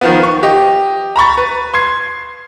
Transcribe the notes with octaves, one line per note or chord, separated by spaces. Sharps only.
D#3 F3 B3
C#6
G4 D#5
A#5 B5 C#6 A6
B4
C6 G#6 C7